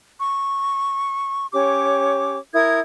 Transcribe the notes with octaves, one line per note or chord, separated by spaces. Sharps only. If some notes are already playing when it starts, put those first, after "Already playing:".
C#6
C#4 G4 C#5 D6
E4 A#4 D#6 G#6